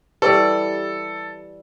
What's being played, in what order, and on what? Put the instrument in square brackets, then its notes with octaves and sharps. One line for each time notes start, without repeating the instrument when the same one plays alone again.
[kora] E3 G3 D5 [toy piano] G4 B4 [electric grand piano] A4